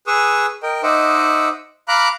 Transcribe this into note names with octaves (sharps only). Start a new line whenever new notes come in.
G#4 B4 C#6 D#6 E6
A#4 D#5 G5
D#4 C5 D#5 E5 F#5 D6
F5 A#5 B5 D6 F#6